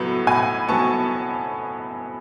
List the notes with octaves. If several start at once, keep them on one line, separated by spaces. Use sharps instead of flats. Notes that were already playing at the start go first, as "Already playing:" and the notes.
Already playing: A2 F#3 B3
A2 G#5 B5
F#3 B3 A5 C#6